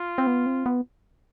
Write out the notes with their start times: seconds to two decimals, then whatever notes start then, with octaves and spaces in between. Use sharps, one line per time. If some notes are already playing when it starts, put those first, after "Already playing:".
Already playing: F4
0.18 C4
0.27 B3
0.46 C4
0.66 B3